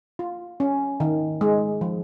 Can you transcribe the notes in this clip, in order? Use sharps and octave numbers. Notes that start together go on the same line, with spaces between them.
F4
C#4
D#3
G#3
F3